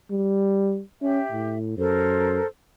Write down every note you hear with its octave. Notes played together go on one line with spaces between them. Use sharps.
G3
C#4 G4 E5
A2
F#2 A4 A#4 C5